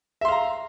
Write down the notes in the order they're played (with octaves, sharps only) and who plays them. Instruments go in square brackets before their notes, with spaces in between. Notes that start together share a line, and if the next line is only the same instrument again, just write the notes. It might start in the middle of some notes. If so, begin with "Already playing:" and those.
[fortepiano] E5
C6
F5
A#5